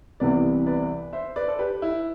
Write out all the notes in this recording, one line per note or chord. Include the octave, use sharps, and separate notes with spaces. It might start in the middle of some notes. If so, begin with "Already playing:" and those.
C2 C3 E3 B3 B4 D5
B4 D5
C5 E5
B4 D5
A4
G4 B4
E4